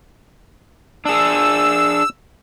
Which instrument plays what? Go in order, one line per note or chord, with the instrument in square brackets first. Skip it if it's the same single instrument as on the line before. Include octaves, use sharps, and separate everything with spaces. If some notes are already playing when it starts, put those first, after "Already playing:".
[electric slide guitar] D4 G#4 [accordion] E6